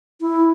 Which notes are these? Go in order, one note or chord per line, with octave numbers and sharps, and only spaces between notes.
E4